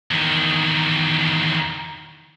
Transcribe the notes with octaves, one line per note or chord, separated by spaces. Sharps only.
E2 D#3